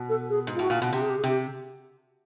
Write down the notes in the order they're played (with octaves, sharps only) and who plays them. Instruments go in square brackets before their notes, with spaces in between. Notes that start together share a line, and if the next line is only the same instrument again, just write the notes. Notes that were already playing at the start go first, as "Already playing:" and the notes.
Already playing: [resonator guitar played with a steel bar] B2
[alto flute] A4
G#4
[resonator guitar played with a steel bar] G#2
[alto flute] F4
[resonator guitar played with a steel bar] A2 [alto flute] F#4
[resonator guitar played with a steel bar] A#2
B2
[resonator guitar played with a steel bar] C3 [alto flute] G4
[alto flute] G#4
G4
G#4
[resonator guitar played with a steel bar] C3 [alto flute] G4